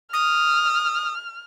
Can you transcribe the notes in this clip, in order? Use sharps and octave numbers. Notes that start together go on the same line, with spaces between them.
D#6 F6